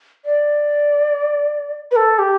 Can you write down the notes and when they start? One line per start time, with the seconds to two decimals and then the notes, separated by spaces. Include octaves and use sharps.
0.25 D5
1.91 B4
1.96 A4
2.18 G4